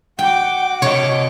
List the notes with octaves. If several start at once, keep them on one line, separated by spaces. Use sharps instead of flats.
F#4 F#5 G5 D6
C3 C#5 D#5